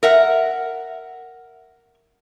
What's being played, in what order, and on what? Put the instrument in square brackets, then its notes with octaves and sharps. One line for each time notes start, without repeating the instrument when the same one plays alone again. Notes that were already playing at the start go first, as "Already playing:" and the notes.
[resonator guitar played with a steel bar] A#4 E5 F#5